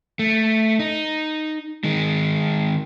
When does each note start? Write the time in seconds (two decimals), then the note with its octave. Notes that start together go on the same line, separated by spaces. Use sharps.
0.19 A3
0.79 D#4
1.84 D#3 G#3